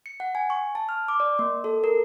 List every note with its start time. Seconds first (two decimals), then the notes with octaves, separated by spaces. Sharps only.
0.06 C#7
0.20 F#5
0.35 G#5
0.50 C#6
0.75 A5
0.89 F6
1.08 D6
1.20 D5
1.39 A#3
1.64 A4
1.84 A#4